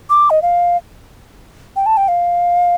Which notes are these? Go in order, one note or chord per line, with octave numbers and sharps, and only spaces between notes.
D6
D#5
F5
G5
A5
G5
F5